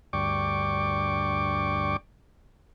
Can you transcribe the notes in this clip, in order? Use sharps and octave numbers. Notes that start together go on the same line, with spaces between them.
D2 G2 D5 G5 C#6 D6